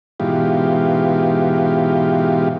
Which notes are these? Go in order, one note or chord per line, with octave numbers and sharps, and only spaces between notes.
G#2 B2 E3 F4 G4